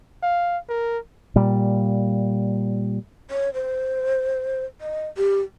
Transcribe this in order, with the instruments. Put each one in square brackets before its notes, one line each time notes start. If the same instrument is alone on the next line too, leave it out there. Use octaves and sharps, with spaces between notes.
[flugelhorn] F5
A#4
[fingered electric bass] A#2 G3
[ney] C#5
C5
D#5
G4